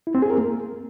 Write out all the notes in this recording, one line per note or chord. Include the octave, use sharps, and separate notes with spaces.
E4
C4
G#4
A#4
A#3